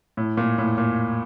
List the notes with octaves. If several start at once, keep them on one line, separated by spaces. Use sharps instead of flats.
A2
A#2
A2
A#2